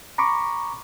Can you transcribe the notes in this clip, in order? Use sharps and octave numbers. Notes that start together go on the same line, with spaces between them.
A#5 B5 C#6 D6